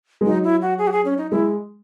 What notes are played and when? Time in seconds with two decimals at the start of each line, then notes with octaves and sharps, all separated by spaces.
0.21 G#3
0.26 F#3 D#4
0.44 E4
0.62 F#4
0.78 G#4
0.87 F#4
0.92 G#4
1.05 C#4
1.18 D#4
1.31 G#3 E4